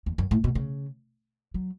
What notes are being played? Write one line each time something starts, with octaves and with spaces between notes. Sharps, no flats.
E2
F#2
A2
B2
C#3
F#3